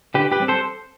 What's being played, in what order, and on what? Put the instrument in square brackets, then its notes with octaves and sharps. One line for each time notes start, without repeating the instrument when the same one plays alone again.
[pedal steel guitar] D3 G4 B4
G4 B4
G3 C4
A4 C5